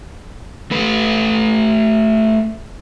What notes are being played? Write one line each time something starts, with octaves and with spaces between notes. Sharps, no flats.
A3 B4